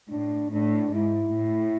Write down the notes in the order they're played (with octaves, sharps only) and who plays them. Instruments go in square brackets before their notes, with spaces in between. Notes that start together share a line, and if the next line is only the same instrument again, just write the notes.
[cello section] A2 [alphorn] D4
[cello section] A2 [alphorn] D4
[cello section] G#2 [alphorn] E4
[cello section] A2